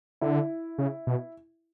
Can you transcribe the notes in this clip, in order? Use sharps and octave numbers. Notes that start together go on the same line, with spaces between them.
D3 E4
C#3
B2